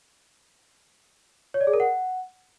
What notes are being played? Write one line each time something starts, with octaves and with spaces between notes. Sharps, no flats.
C#5
D5
G#4
A#4
F#5